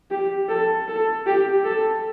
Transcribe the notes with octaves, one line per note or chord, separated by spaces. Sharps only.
G4
A4
A4
G4
A4